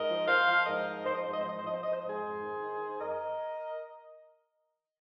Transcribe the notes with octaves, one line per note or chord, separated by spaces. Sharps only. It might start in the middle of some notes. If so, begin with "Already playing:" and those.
Already playing: G#2 A#4 D#5
F3
F3 C5 F5
F3
G#2 A#4 D#5
F3
F3 C5
D#5
G#2 C5
D#5
C5
F3 D#5
C5
F3 D#5
C5
F3 D#5
C5
G#2 D#5
G#4 C5
F2
D#3
D#3
D#3
F2 A#4 D#5